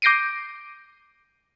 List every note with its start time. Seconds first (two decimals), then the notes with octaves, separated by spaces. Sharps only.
0.02 D6 G6 A#6 C7 D7 D#7